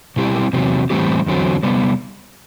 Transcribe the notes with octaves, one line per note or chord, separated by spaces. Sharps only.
B2 G3 C4 E4 G4
E2 C3 F#3
A2 E3 G3 C4 G4
E2 D3 F#3 C4
C3 G3 B3